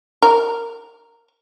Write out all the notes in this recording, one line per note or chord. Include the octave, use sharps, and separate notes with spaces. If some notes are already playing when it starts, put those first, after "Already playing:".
A#4